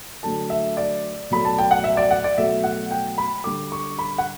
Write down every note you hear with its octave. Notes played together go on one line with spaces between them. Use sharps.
D3 F#3 A3 A5
E5
D5
B2 F#3 A3 B5
A5
G5
F#5
E5
D5
F#5
D5
B2 F#3 A3 E5
F#5
G5
B5
D3 G3 D6
C#6
B5
F#5